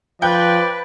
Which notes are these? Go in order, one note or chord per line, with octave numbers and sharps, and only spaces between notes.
F3 B4 D5 G5 F#6 G6